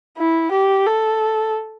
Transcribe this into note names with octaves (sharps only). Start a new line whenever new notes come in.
E4
G4
A4